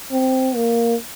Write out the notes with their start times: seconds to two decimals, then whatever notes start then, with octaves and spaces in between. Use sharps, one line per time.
0.11 C4
0.55 A#3